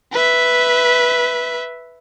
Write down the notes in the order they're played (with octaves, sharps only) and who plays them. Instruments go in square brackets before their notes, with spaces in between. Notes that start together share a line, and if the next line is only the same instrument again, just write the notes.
[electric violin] B4 E5